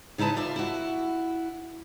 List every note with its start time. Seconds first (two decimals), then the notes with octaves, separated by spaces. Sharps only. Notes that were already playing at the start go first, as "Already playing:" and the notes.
0.18 C#3 D#4 E4 B4 A5
0.36 F4 D5 E5
0.56 E4 F#4